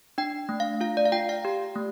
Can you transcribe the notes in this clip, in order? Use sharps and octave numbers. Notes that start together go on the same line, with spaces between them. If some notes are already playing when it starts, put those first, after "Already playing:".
D4 G5
A3
F5
F4 F5
D5
F5
F4 G5
F5
G4
A3